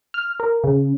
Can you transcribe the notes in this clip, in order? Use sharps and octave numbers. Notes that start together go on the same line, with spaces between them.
F6
A#4
C#3